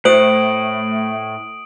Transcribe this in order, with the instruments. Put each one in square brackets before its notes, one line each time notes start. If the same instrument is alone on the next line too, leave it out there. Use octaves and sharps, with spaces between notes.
[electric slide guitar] A2 [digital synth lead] A3 [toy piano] C5 [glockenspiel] D#6 D7 F#7